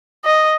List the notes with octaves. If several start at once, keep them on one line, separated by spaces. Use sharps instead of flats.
D#5